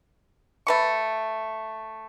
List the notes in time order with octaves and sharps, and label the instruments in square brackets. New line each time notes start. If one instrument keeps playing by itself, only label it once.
[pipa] A3 B4 C#6